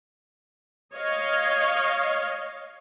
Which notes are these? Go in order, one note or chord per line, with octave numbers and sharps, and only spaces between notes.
C#5 D#5 F5